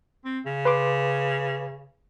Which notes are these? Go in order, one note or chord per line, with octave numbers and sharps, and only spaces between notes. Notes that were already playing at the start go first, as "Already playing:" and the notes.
C4
C#3
B4 C6 D6